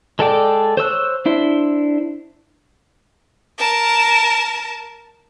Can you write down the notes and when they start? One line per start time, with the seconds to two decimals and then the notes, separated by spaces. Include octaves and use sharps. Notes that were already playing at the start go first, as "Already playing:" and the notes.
0.19 G#3 A4 D5 G5 D6
0.77 C5 C#5 E6 F#6
1.26 D4 E4 C5
3.58 A#4 A5